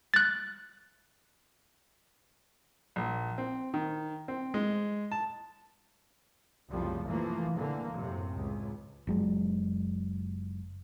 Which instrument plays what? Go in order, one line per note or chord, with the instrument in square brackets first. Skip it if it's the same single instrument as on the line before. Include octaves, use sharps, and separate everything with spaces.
[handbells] F#6 A6
[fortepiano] A#1
C4
D#3
C4
G#3
A5
[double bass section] C2 F#2 C#3 F3 G3 A3
E3 F3 A3 A#3
D3 E3 A#3
F#2 A2 C3
C#2
[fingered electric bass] F#1 F#3 G#3